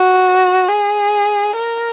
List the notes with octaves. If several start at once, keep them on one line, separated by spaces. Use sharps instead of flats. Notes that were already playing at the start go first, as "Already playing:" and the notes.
Already playing: F#4
G#4
A#4